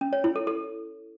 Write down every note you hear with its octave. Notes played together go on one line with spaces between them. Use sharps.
C#4
C#5
E4
A4
A4